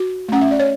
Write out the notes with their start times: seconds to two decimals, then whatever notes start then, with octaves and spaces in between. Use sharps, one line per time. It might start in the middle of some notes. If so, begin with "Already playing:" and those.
Already playing: F#4
0.29 A3 C#4 F#5
0.41 E5
0.51 D5
0.60 C#5